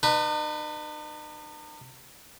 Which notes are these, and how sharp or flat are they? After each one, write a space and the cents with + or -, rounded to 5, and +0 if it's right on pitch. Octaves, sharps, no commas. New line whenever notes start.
D#4 -45 B4 +0